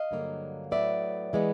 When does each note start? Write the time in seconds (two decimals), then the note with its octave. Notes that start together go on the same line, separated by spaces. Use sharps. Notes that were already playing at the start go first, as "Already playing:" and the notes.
Already playing: D#5 F5
0.11 G2 D3 F#3 A#3
0.72 A2 F#3 B3 D5 E5
1.33 E3 G#3 B3